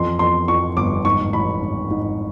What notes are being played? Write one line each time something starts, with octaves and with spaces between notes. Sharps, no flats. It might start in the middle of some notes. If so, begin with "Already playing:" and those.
Already playing: F2 E3 C6
F2 C6
F2 C#6
G1 D6
G#2 C#6
A1 B5
G#2
G#2